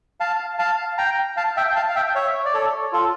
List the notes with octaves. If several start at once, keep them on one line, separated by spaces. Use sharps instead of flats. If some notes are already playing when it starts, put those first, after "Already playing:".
F5 A5
F5 A5
G5 A#5
F5 A5
E5 G5
F5 A5
F5
E5 G5
C#5 E5
D5
A4 C#5
F4 A4